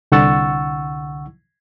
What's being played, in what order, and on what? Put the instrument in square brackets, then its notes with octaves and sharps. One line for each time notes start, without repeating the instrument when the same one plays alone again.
[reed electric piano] C2 D3 F#5 C#6 E6 A6